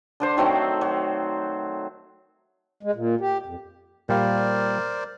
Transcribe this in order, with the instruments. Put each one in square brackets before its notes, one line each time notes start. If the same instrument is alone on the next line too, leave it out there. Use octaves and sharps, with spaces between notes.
[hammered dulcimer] D3 D4 C5
D#3 F#3 A3 C4
F#3
[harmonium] G#3
A#2
G4
F2
[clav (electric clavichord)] A#2 G3 F5 [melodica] A#4 C5 D5